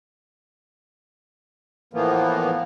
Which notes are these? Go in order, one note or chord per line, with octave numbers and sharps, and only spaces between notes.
A2 E3 F3 A#3 B3